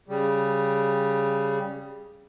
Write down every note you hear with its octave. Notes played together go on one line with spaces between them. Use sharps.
C#3 G3